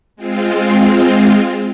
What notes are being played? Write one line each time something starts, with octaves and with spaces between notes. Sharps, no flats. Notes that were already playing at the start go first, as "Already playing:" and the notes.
G#3 C4 F4